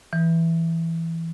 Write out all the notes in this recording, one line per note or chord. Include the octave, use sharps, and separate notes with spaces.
E3